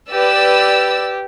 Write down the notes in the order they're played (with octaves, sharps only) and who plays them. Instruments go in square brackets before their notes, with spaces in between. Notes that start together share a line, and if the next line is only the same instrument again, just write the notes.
[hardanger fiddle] G4 [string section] B4 D5 E6